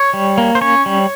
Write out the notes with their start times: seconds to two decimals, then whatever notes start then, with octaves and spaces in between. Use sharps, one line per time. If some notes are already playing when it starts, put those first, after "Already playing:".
Already playing: C#5
0.14 G3
0.38 A#3
0.55 C5
0.61 C#4 C#5
0.86 G3